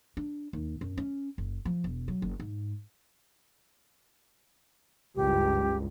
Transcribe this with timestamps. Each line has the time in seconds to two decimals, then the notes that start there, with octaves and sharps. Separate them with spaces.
0.17 D4
0.53 D#2
0.81 F#2
0.98 C#4
1.38 F#1
1.65 F3
1.84 E1
2.08 F#3
2.22 F#1
2.40 G#2
5.16 F#1 C#2 G2 G4